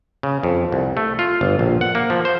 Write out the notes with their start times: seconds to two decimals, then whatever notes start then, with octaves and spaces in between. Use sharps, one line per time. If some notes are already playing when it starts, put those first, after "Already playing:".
0.23 C#3
0.43 F2
0.72 C2
0.97 A3
1.19 F4
1.41 G1
1.59 A#1
1.81 F#5
1.95 A#3
2.10 F3
2.25 C5